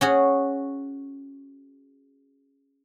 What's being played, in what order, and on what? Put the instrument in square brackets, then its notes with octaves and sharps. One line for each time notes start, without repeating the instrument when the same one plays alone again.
[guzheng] C#4 F#4 G#4